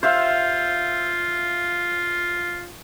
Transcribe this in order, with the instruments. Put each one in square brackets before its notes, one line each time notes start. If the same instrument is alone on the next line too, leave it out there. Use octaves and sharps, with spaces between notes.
[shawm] F4 [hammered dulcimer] C5 E5 F5